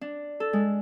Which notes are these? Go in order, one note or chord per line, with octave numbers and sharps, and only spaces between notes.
D4
A4
G#3